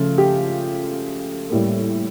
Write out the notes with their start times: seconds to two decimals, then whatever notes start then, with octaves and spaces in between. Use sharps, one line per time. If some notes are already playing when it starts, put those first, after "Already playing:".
Already playing: C#3 F3 A3 F4
0.18 G4
1.50 A2 G3 A#3